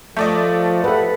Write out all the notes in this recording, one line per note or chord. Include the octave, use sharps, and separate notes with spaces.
F3 A3 A4 D5 D#5
G4 A4 B4 E5 F#5